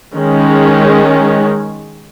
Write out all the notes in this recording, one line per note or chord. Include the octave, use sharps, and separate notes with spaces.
D#3 G#3 C#4